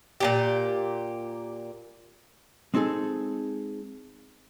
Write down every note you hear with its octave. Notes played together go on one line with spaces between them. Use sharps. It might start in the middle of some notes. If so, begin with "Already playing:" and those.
A#2 C#3 G4
G#3 C4 D#4 G#4 A4